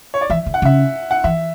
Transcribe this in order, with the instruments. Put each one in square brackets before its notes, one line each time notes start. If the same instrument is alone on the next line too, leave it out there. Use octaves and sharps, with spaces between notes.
[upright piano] C#5
D5
[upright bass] E3 [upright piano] E5
[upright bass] D3
[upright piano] F#5
[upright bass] C#3 [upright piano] E5
[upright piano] F#5
[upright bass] E3 [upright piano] E5